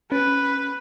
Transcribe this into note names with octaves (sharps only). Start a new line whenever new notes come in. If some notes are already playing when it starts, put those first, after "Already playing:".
C#4 B4